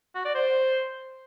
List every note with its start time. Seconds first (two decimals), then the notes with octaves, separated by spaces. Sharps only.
0.15 F#4
0.25 D5
0.35 C5